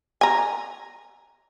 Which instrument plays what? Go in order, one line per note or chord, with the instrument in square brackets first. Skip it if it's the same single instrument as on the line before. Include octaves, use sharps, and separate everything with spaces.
[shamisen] G#5 A#5